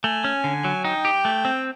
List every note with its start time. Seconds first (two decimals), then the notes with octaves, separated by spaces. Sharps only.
0.04 A3 G#5
0.24 C#4
0.44 D3
0.64 F#3
0.84 D#4 G5
1.05 G4
1.25 A3
1.45 C4